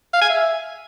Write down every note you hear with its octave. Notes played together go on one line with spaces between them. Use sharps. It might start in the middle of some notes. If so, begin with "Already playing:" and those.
F5
G#5
E5